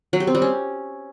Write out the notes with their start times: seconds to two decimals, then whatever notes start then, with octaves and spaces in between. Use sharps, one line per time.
0.13 F#3
0.20 G4
0.27 C4
0.35 G3
0.42 C#4